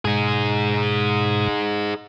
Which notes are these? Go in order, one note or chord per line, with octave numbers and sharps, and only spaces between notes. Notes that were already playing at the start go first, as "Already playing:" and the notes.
G#2 B2 G#3 D#4 G#4